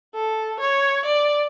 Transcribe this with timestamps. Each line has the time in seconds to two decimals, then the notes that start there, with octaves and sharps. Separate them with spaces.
0.15 A4
0.60 C#5
1.06 D5